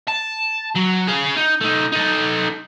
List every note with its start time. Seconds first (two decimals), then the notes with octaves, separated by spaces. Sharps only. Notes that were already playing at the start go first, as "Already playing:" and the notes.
0.08 A5
0.75 F#3
1.07 G#4 F5
1.37 D#4
1.61 A3 D#4
1.92 D#4 A4